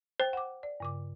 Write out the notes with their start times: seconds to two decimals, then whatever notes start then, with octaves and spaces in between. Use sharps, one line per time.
0.20 C5 G5 A6
0.33 F#5 D6
0.63 D5
0.80 G2 C#3 D6